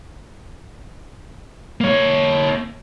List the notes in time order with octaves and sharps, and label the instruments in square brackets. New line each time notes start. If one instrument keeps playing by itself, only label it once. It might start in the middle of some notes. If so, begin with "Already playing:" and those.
[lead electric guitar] A#3 C#5